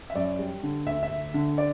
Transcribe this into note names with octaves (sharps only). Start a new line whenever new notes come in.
E5
F#2 D5
G3
D3
D2 E5
E5
D2
D3
D5